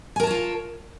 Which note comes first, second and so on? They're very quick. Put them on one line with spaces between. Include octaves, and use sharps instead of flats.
G#5 A#4 A5 C#5 F4